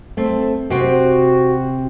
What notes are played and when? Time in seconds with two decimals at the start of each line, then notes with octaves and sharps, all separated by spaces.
0.17 A3 C4
0.70 C3 C4 F#4 G5